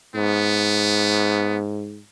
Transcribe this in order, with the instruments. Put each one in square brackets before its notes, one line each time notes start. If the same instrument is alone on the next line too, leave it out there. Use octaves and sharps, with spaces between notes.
[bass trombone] G#2 [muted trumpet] B3